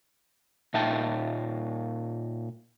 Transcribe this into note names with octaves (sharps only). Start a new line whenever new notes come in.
A#2 D#4 E5 G5 A5